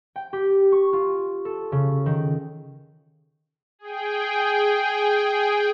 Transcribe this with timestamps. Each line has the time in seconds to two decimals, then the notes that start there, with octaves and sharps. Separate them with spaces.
0.16 G5
0.33 G4
0.72 C#6
0.93 F4
1.45 A4
1.72 C#3
2.06 D#3
3.79 G#4 G5